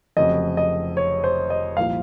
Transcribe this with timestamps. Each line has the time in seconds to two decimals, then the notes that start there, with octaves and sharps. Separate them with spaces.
0.17 F1 F2 C#3 F#3 D#5
0.57 D#5
0.97 C#5
1.24 C5
1.50 D#5
1.77 C2 A#2 F3 F5